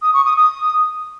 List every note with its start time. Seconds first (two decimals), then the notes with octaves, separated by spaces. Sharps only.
0.02 D#6
0.14 C#6
0.25 D#6
0.36 D#6